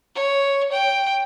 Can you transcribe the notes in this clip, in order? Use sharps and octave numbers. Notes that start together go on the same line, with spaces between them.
C#5
G5